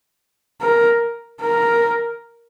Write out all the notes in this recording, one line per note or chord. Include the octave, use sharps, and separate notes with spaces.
A#4
A#4